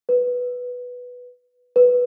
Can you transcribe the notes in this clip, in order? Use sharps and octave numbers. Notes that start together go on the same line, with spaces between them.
B4
B4